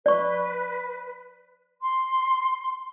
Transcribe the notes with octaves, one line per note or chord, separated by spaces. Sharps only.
B4 D5 C#6
C6